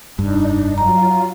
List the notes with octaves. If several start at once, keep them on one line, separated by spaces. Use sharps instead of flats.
F1 G2 D4 D#4
F#3 F4 A#5